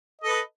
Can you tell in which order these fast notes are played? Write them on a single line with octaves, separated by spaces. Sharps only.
D#5 A4 B4